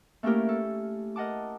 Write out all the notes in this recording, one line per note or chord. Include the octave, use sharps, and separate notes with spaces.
A3 A#3 C#4 E4 G4 A#4
A4
A#4 D#5 F#5 A5 D6